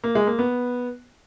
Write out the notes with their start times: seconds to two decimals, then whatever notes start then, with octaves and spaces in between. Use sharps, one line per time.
0.04 A#3
0.15 G#3
0.27 A#3
0.39 B3